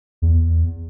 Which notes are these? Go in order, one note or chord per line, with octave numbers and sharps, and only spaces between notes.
E2